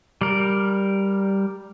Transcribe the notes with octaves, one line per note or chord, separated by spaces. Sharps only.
G3 A#4